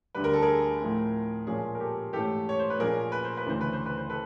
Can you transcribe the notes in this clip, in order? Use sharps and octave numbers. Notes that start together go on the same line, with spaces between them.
D2 D3 G3 B4
A#4
A4
G#4 A#4
A2 F3 A3 C4
A#2 F3 G#3 C#4 G#4
A#4
G4 A4
G#2 E3 A3 C#4 G4 A4
C#5
C5
B4
A#2 F3 A#3 C#4 G#4 A#4
B4
C5
B4
D2 C#3 E3 A3 C5
B4
C5
B4
C5
A4 B4